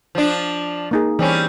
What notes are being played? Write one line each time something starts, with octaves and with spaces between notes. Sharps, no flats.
F3 D4
A#3 D#4 G#4
E3 G3 C4 C#4